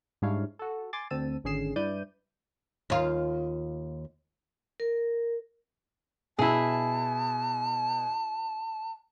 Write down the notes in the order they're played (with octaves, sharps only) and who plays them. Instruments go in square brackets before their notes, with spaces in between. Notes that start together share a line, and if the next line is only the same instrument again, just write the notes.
[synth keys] G#2 G3 D4 E4 C#5 F5
F#4 A4
G#5 C6 D6 A6
D2 C4 A5 E6 D#7
G#1 D3 C#4 G#4 C7 E7
G2 E4 B4 D5 G6 D#7
[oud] D#2 F4
[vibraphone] A#4
[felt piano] B2 [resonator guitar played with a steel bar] E4 G#4 [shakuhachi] A5